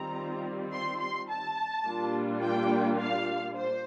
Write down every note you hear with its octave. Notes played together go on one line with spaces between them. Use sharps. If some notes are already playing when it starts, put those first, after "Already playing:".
Already playing: D#3 G3 C4 F4 A#5
C6
C6
A5
A#2 G3 A#3 D4 F4
G5
F5
C5